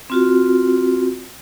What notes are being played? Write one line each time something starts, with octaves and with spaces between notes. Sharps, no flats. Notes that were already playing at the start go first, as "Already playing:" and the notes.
C4 F4 F#4